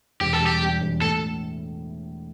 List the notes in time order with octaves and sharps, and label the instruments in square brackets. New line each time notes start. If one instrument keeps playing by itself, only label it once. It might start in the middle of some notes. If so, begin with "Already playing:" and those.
[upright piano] E1 [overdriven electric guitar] G4
[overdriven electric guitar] A4
[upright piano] G3
[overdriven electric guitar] G4
[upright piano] G3
E1
[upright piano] A2 [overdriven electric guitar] A4